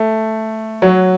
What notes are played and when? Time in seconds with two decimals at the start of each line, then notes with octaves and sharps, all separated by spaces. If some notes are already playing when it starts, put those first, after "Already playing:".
Already playing: A3
0.82 F#3